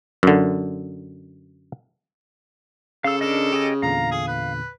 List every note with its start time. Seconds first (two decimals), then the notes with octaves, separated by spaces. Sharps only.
0.23 F#2 D3
3.04 C#3 A4 F5 E6
3.21 D4 A4 A#4 D#5
3.53 G4 G#4 D#5
3.82 E2 A#2 D3 F5 A#5
4.11 G#4
4.28 B4